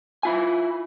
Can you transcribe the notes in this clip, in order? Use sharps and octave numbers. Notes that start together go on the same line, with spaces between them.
E4 F4 G#5